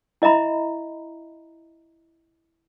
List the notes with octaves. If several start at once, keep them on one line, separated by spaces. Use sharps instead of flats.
E4 D#5 E5 A#5 B5